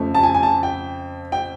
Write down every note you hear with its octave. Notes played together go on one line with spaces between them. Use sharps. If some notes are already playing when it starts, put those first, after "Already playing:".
Already playing: F2 C#3 F3 A3
A5
G#5
G#5
A5
G5
G5